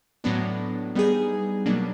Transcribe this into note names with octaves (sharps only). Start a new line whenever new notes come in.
A2 F#3 B3 D4
G3 B3 D#4 G#4
B2 F#3 A#3 D4